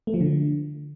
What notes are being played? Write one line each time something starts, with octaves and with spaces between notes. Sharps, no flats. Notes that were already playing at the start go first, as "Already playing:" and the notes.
A3
F3
D3